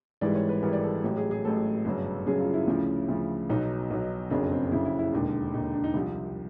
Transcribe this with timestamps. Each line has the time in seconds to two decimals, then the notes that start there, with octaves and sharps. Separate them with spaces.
0.21 G#1 G#2 E3 G3 D5
0.35 C#5
0.49 B4
0.62 G#1 G#2 E3 G3 A#4
0.73 D5
0.84 A4
1.03 A1 A2 F#3 G4
1.17 G#4
1.31 G#4
1.45 A1 A2 F#3 A4
1.85 G1 F#2 C#3 F#3
2.27 G1 F#2 C#3 F#3 G#4
2.40 F4
2.54 E4
2.67 D2 C#3 F3
3.08 D2 C#3 F3
3.50 B1 B2 F#3 D#4
3.90 B1 B2 F#3
4.30 F#1 F2 C#3 F#3 D4
4.52 C4
4.71 F#1 F2 C#3 F#3 E4
4.85 E4
4.99 E4
5.13 E1 D#2 D3 D4
5.54 E1 D#2 D3 D#4
5.64 D#4
5.74 D4
5.84 D#4
5.94 C2 C3 F3